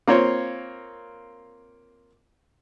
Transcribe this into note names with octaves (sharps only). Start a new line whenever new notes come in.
A#3 C4 F4 C#5